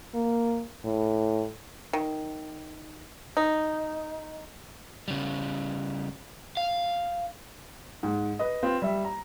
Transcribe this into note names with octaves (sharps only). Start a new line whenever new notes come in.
A#3
A2
D#3
D#4
C#3 G3
F5
G#2
B4 D#5
C4 F4 B4
G3 E5
A#5